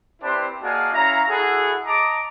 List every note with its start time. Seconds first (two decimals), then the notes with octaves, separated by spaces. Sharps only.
0.22 C4 D4 E4 G4 B4 C5
0.62 A#3 D4 F#4 G#4 D#5 F5
0.93 C#4 E4 F5 A#5
1.29 E4 F#4 G#4 A4 F#5
1.85 D#5 A5 A#5 D6